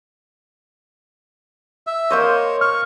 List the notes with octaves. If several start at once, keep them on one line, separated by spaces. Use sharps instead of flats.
E5
A#3 C5 C#5 D#5
C#6 F6